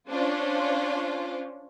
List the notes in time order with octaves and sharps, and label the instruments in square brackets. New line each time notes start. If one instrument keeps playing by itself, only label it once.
[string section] C#4 D4 F4 C5